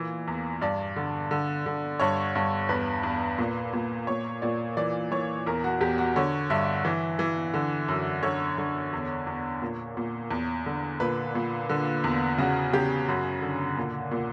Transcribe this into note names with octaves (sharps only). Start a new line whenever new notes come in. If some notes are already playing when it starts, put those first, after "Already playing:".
Already playing: A#2 E3
E2
G2 D5
D3
D3
D3
G2 C#5
G2
E2 B4
E2
A#2
A#2
A#2 C#5
A#2 D5
E3 D5
E3 C#5
E2 A#4
F#4
E2 G4
F#4
D3 C#5
G2 E5
E3
E3
D3
F#2
D3 C#5
D3
E2
E2
A#2
A#2
E2
D3
A#2 B4
A#2
D3
E2
C#3 F#4
C#3 G4
F#2 F#4
D3
A#2
A#2